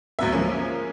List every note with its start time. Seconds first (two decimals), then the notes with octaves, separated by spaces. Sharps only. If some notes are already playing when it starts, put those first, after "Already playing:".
0.19 D2 F#3 B3 E5
0.32 F3 G#3 A#3 C#4